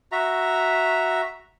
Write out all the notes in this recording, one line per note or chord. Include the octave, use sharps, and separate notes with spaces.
F#4 E5 A#5